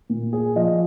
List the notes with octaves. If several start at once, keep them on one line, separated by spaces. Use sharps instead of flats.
A#2
G#4
F3 D#5